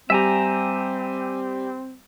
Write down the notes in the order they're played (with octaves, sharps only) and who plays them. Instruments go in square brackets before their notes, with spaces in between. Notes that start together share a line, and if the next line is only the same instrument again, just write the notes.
[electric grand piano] G3 G4 [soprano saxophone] C4 [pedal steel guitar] E5 G#5 A#5